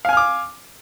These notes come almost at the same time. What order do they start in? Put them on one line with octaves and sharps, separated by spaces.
F5 G#5 F6 D6